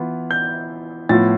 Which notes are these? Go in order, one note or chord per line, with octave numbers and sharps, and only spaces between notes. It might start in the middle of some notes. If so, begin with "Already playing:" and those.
Already playing: E3 B3 F4
G6
A2 F3 B3 F4 A6